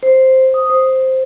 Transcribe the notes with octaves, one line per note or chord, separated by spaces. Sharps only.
C5
D#6
C5